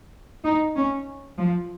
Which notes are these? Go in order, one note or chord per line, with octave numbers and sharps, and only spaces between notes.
D#4
C#4
F3